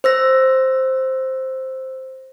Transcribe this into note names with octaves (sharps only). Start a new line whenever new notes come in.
C5 E6 A#6